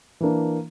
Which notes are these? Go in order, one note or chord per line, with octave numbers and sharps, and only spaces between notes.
E3 A#3 D4